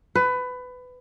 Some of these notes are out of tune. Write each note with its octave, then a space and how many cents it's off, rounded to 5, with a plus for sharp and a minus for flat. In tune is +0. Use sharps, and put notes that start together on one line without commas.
B4 +20